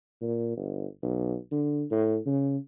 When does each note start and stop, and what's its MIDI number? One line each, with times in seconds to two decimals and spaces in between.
0.22 0.54 46
0.57 0.86 31
1.03 1.36 35
1.51 1.84 50
1.91 2.18 45
2.26 2.57 49